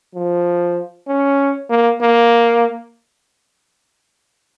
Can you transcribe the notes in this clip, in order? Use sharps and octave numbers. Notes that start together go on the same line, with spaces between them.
F3
C#4
A#3
A#3